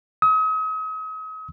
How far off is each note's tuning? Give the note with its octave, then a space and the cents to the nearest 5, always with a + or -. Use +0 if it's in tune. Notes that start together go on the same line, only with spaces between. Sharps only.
D#6 +40